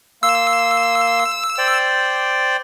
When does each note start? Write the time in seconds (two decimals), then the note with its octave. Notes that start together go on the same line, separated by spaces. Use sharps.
0.23 A#3 C6 E6
1.58 C5 D5 G5